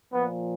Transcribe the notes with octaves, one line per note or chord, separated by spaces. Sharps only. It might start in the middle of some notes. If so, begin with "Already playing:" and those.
A#2 F3 B3